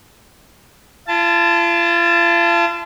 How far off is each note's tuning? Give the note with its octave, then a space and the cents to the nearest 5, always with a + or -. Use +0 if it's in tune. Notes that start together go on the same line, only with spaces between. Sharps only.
F4 -40 A5 +0